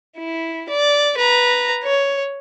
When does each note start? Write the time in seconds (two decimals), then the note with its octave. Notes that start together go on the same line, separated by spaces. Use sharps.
0.18 E4
0.69 D5
1.17 B4 A#5
1.84 C#5